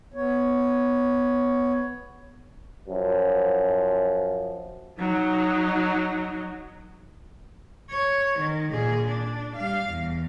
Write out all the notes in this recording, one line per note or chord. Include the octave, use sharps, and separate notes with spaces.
B3 C#5
F#2 F3
F#3 D#4
C#5
D#3
A#2 G#4
D4
G3 F5
E2